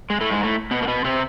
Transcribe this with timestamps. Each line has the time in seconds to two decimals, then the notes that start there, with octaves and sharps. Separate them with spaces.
0.10 G#3
0.21 A2 A3
0.32 G#2 G#3
0.43 A2 A3
0.71 B2 B3
0.82 A#3
0.88 B2 B3
1.04 C3 C4